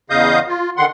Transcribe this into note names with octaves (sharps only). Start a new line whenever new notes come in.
E2 C#3 D#5 F5 D#6 G6
F4
D3 D#3 F#5 C6